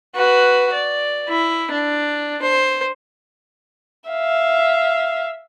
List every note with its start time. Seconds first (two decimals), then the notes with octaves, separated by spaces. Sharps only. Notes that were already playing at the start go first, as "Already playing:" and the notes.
0.16 F#4 B4
0.73 D5
1.29 E4
1.71 D4
2.42 C5
4.09 E5 F5